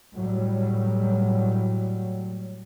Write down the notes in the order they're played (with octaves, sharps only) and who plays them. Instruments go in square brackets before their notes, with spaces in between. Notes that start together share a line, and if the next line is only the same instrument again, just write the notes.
[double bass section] A2 F#3 G3